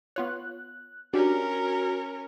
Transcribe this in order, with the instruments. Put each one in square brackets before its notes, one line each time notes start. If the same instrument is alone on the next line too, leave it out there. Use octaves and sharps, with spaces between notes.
[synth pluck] B3 F4 C#5 [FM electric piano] F#6
[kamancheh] C#4 A#4 [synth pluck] D4 G4 [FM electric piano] F#4